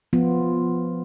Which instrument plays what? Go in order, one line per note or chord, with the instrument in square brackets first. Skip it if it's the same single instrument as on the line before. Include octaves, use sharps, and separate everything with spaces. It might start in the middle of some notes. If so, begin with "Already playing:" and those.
[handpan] F3 B3 F4